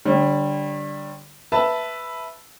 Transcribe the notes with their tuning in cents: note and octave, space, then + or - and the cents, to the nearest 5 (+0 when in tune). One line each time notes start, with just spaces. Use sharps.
D3 +0 G3 +0 C#5 -30
B4 +0 E5 +0 A5 +0